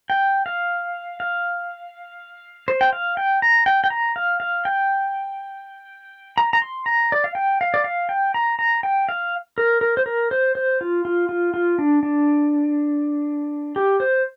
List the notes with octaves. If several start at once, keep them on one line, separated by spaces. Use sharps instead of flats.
G5
F5
F5
C5
G5
F5
G5
A#5
G5
G5
A#5
F5
F5
G5
A#5
A#5
C6
A#5
D5
F5
G5
F5
D5
F5
G5
A#5
A#5
G5
F5
A#4
A#4
C5
A#4
C5
C5
F4
F4
F4
F4
D4
D4
G4
C5